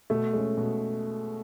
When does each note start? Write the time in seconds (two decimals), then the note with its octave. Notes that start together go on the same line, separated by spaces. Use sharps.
0.10 B2 A3
0.33 G#3 C#4
0.57 B2